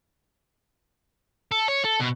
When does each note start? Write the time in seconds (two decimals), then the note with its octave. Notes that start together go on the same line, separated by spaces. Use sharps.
1.51 A4
1.68 C#5
1.85 A4
2.00 B2